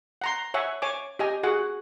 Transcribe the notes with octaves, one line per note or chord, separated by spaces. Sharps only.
F#5 A#5 C6
C#5 E5 F#5 G#5
C#5 G#5 D6
G4 D#5 G#5
F#4 G#4 F#5